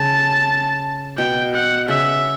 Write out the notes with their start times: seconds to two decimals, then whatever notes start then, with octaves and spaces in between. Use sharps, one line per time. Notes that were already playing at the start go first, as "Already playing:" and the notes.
Already playing: C#3 A5
1.18 B2 G5
1.54 F#5
1.88 C#3 E5